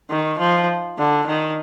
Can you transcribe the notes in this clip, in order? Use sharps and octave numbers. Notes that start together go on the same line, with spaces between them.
D#3
F3
D3
D#3